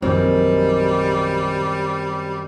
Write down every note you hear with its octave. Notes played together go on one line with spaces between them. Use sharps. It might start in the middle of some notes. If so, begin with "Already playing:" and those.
A#1 F#2 D#3 F#3 G3 C4